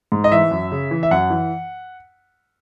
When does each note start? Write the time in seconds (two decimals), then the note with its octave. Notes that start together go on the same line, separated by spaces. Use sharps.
0.12 G#2
0.24 D#5
0.32 E3 E5
0.51 F#2
0.72 C#3
0.91 E3
1.03 E5
1.11 F#2 F#5
1.30 E3